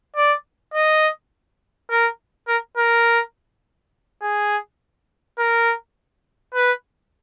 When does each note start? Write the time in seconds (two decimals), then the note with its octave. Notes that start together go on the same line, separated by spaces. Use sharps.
0.16 D5
0.74 D#5
1.90 A#4
2.48 A#4
2.77 A#4
4.22 G#4
5.39 A#4
6.54 B4